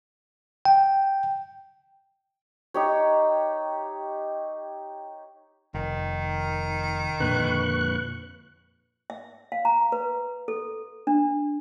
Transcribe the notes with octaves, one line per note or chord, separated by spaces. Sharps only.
G5
D#4 G4 C#5
F1 D#3
F2 A#2 D3 B4 C#6 F#6
E5
F5
A#5
B4
A4
D4